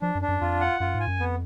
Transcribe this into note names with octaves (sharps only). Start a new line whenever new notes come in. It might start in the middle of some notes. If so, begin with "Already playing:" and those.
F3 D4
F#2
D4
F#2
F2 F4
F#5
F#2 F4
G#2
G#5
F#2
F2 B3